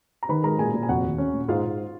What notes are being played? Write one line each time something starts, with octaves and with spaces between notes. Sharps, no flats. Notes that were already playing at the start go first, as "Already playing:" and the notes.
A#5
D#3 B4 B5
G#3 A#4 A#5
A#2 G#4 G#5
A#2
G#5
F1 F#4 F#5
D#2
C#4
A#2
G#2 F4 F5
G#2